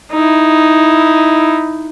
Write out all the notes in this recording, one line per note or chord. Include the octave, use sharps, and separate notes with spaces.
D#4 E4